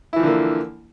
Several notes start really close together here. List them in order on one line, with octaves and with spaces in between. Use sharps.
E4 E3 F3 D3 A#3